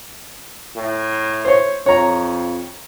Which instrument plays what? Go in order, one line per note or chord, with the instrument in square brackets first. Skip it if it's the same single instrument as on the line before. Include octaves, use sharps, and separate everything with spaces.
[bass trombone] A2
[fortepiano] C5 C#5
[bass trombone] F2 [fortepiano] C#5 A#5